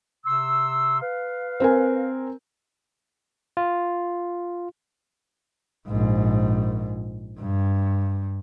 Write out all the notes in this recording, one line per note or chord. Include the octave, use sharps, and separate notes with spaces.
C3 C6 E6
B4 F5
C4 A#4 G#5
F4
A#1 G#2
G2